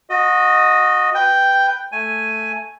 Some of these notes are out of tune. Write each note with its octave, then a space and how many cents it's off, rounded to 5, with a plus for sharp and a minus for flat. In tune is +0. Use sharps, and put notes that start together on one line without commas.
F#4 -25 D#5 +0
B4 +0 G5 +0
A3 +0 G#5 +0